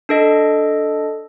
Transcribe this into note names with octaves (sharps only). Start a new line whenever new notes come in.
D4 A4 D#5